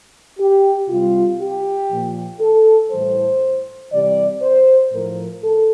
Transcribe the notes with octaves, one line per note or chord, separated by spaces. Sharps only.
G4
C3 G3 F4
G4
A#2 F3
A4
A2 E3 G3 C5
C3 E3 G3 D5
C5
A2 F3 A#4
A4